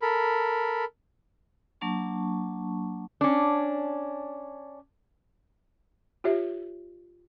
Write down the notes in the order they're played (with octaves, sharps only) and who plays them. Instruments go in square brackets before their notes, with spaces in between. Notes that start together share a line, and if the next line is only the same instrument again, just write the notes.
[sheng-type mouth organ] A4 A#4 B5
[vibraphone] F#3 A#3 D4 A5 C#6
[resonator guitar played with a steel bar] C#4 D4
[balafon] F4 G4 C#5 E5